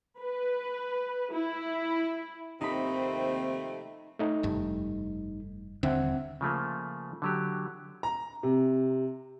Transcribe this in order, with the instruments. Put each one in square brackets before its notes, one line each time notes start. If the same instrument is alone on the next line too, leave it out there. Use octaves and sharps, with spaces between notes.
[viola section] B4
E4
[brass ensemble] D#2 C4 [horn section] C3 F3 A3 [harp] D#4 B5
[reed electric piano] A3 D#4
[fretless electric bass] F1 G2
[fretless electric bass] D#1 D3 D4 [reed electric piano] C4 E5 F#5
[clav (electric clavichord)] C#3 F3 A3 A#3
D3 F#3 G4
[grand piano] A#5
C3